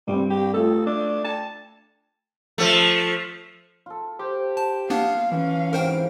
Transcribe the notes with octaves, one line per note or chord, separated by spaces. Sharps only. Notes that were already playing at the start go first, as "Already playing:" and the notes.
G2 G3 C4
G4
A3 F4 A4
D4
A5
F3 A3
F4 A4
G4 C5
A5
A#3 B3 D4 F5
E3 C#4 F5
G#2 C3 F#4 A#4 C5 G5